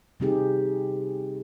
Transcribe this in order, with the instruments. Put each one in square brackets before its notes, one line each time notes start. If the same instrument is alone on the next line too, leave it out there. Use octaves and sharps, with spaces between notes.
[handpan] C3 G3 C4 D#4 G4 G#4